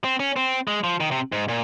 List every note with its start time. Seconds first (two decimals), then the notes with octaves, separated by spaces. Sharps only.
0.04 C4
0.20 C#4
0.36 C4
0.68 G#3
0.84 F3
1.00 D#3
1.11 C3
1.32 G#2
1.49 A#2